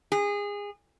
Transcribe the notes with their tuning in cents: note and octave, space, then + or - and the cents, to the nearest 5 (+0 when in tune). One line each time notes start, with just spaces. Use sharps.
G#4 -25